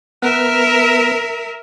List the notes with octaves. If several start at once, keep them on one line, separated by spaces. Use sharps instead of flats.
B3 A#4 B4 E5